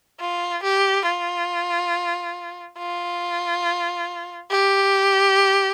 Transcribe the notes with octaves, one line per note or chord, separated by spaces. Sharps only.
F4
G4
F4
F4
G4